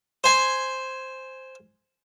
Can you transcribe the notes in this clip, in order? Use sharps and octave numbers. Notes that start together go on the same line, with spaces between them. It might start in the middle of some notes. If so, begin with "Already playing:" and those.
C5 G#5